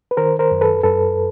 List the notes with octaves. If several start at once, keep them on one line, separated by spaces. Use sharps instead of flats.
B4
D#3 A#4 C5
A#4 C5
F#2
A4 B4
F#2 A4 B4